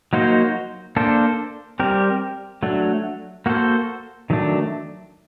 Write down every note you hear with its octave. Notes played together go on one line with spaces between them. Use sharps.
F#3 A#3 D#4 F#4 C5
A#3 D4 A4 C5
G3 C4 G4 A#4
F#3 A3 D4
A#3 F#4 A4 C5
D#3 F#3 A3 D4